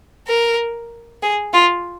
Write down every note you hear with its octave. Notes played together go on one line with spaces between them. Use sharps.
A#4
G#4
F4